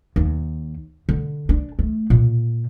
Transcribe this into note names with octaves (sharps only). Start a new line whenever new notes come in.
D#2
D3
D4
A3
A#2